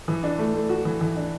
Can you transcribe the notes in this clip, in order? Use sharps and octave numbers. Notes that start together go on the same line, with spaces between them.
E3
D4
A3
A3
F#4
E3
E3
D4